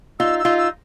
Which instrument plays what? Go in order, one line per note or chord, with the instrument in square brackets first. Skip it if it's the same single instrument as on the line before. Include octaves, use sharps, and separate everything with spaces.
[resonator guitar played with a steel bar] D#4 F4 [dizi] E6
[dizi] E6
[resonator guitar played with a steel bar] D#4 F4
[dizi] E6